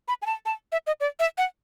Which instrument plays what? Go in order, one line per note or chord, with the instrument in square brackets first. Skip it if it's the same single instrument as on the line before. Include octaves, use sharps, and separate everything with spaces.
[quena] B5
G#5
A5
A5
E5
D#5
D5
E5
F#5